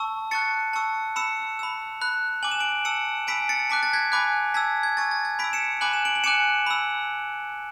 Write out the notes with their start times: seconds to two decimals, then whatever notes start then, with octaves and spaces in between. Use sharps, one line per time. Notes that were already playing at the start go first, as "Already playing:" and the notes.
Already playing: A5 C#6 E6
0.31 A5 C#6 F#6 A6 C#7
0.73 A5 C#6 E6
1.16 B5 E6 C#7 E7
1.59 B5 E6
2.01 B5 F#6
2.43 G#5 D6 F#6 F#7
2.51 E7
2.60 D7 F#7
2.85 A5 E6 C#7 E7
3.27 G#5 B5 E6 B6 D7
3.49 A6 C#7
3.70 A5 D6 F#6 B6
3.83 A6
3.93 G#6 B6
4.12 G#5 B5 D6 F#6
4.54 A5 E6 G#6 B6
4.83 G#6
4.97 G#5 C#6 E6 A6
5.11 A6
5.25 G#6
5.39 B5 B6 D7
5.44 E6
5.53 C#7 E7
5.81 G#5 B5 D6 F#6 F#7
5.93 E7
6.05 D7 F#7
6.15 F#7
6.24 G#5 D6 F#6 C#7 E7
6.66 B5 E6